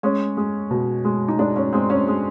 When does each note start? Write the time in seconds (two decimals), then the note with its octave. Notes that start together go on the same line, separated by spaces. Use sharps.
0.03 G#3 C#4
0.37 G#3
0.71 B2
1.05 G#3
1.28 D#4
1.39 G#3 D4
1.56 C#4
1.73 G#3 C4
1.90 C#4
2.08 G#3